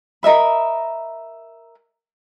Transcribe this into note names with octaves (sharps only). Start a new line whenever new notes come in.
A#4 D#5 E5 B5